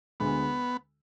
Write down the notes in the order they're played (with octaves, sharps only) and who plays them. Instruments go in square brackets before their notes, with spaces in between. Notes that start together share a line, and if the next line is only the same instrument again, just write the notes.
[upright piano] D2 D3 G#3 [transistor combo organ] B3